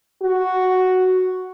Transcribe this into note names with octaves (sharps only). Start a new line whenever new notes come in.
F#4